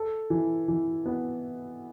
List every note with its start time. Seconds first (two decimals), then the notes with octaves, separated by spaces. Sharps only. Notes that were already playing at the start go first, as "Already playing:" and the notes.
Already playing: A4
0.30 E3
0.68 E3
1.06 B3